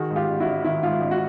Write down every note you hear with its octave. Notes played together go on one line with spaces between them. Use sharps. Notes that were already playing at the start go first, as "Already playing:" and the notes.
Already playing: D#3 F#4 G#4
G#2
F4 G4
A1
E4 F#4
A1
D#3 E4
G#2 F4
A1
F#4